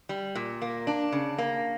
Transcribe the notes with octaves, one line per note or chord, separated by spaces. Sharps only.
G3
A#2
A#3
D4
C#3
A#3